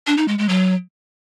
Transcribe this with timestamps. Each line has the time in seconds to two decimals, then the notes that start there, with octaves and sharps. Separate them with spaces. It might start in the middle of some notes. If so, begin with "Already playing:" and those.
0.07 D4
0.18 D#4
0.28 G#3
0.38 G#3
0.49 F#3